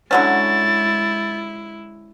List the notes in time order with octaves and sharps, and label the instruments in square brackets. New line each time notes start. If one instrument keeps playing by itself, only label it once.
[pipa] D3 F#3 C#4 [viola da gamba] G#3 E4 [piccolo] A6